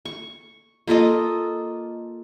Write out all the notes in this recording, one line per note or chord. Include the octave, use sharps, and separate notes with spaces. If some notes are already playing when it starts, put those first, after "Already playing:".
C#6
A#3 F4 A4 D#5